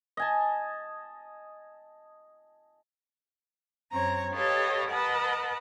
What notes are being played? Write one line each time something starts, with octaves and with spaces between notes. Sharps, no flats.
D#5 G#5 A5
F#2 C4 C#5 A#5
G4 A4 B4 C#5 D#5 F5
A#4 B4 D#5 F#5 A5